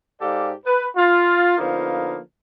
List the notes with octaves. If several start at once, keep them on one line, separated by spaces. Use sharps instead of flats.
G#2 G4 A4 D5 F5
B4
F4
D3 F3 A#3 B3 D#4